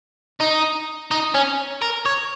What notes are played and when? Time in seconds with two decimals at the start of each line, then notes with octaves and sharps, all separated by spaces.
0.41 D#4
1.11 D#4
1.34 C#4
1.82 A#4
2.05 C#5